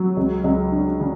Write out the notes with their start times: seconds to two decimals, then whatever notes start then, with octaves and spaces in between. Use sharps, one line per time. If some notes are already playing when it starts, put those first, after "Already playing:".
Already playing: F#3
0.17 C#2
0.44 C#2
0.72 D4
1.00 C#3